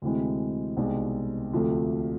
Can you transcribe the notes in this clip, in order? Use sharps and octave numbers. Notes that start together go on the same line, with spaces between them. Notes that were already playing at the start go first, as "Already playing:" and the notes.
D2 C3 E3 G#3 C4
C2 B2 G#3 C4 D#4
D2 C3 F3 A3